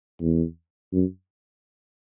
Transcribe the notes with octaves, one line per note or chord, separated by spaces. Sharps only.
E2
F#2